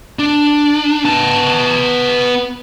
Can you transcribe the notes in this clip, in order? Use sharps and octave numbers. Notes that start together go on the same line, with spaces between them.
D4
B3 A5